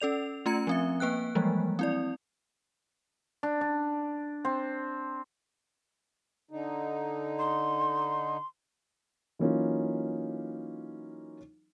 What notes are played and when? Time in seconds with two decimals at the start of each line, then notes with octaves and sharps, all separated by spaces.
0.01 C#4 A4 D5 F7
0.46 A3 C#4 F4 A#5 G#6 C#7
0.67 F3 C4 E5
1.00 A#3 B4 G5 F#6
1.35 E3 F3 G3 G#3 A#3
1.79 C4 E4 D5
3.43 D4
3.61 D4
4.45 C4
6.51 D3 D#4
7.39 C6
9.39 E3 F#3 A#3 C#4 D#4 F4